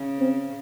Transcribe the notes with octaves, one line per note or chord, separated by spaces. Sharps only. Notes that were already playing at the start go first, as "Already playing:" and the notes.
Already playing: C#3
C4